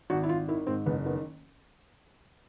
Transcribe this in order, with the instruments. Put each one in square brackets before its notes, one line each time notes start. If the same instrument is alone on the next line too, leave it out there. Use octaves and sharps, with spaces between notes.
[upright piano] G#1 [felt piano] F#4
[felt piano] E4
[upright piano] G#1 [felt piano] F4
[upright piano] D#3 [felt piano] E4
[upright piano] G#2 [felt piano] C4
[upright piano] F#1 [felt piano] B3
[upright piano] D#3 [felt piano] B3